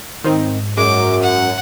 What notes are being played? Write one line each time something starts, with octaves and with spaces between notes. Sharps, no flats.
G#2 D#3 C4 D#4
F#2 G#3 D6
F#5